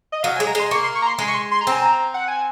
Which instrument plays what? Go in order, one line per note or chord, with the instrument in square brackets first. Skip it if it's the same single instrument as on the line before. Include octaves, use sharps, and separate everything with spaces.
[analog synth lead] D#5
[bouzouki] F#3 [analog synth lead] F5
[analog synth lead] G#5
[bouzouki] G#3
[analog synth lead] A#5
[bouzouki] G#3 [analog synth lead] C6
[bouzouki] A#3 [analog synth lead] C#6
[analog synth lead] C6
C#6
A#5
C6
[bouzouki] G#3 [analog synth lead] C6
[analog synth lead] C#6
C6
C6
A#5
[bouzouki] C4 [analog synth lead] G#5
[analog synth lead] A#5
F#5
G#5